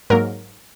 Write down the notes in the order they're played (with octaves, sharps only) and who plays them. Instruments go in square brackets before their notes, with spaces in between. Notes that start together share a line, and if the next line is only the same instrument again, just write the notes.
[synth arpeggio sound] G#2 F#3 A#3 A#4